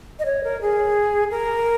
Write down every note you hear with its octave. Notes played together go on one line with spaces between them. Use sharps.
D#5
C#5
A#4
G#4
A#4